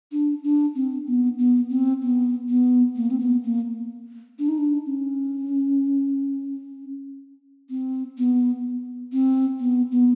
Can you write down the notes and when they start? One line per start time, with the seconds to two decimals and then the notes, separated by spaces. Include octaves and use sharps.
0.12 D4
0.44 D4
0.76 C4
1.07 B3
1.39 B3
1.70 C4
2.02 B3
2.49 B3
2.96 A#3
3.10 C4
3.20 B3
3.44 A#3
4.39 D4
4.48 D#4
4.58 D4
4.86 C#4
7.70 C4
8.18 B3
9.12 C4
9.60 B3
9.91 B3